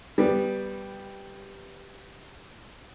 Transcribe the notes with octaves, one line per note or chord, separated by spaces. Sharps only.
G3 B3